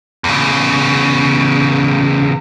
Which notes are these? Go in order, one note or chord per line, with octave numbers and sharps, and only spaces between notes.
E2 C#3